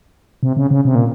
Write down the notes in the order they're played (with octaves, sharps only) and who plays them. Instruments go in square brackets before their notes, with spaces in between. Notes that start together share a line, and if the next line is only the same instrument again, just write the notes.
[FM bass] C3
C#3
C#3
C3
A#2